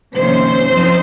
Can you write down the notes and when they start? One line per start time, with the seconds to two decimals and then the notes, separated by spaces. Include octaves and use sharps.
0.15 F2 C3 D#3 A#3 C#4 C5
0.66 F#2 F3 C4 D#4